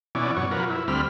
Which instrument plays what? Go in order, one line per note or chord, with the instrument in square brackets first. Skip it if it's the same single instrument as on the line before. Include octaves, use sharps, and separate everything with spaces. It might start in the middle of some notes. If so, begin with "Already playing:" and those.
[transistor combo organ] B2 E3 C#4 D5
F#2 B2 C#5
F3 F#3 A#4 B4
E4
D2 G3 C4 B5 F6